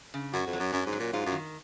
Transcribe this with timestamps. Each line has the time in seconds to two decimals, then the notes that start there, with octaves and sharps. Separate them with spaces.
0.14 C#3
0.33 F#2 F#4
0.47 F2
0.53 F#3
0.60 F#2
0.72 F#2 C#4
0.86 G#2
0.93 F#3
1.00 A#2
1.13 G#2 F4
1.26 F#2
1.32 D#3